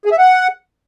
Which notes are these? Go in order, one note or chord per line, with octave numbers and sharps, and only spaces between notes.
G#4
E5
F#5